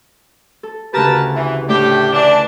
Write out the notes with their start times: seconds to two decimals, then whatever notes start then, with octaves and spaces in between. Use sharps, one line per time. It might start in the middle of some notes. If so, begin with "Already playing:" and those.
0.63 A4
0.93 D2 C#3 G4 A#4 B4 A5
1.34 E3
1.69 A2 A3 D4 G4
2.13 E3 D4